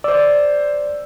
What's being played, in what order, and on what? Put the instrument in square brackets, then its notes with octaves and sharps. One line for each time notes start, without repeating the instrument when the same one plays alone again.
[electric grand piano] C5 E6 [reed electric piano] D5